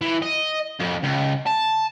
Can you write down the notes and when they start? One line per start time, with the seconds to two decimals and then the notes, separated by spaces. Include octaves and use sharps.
0.01 E3
0.22 D#5
0.80 F2
1.04 C#2
1.47 A5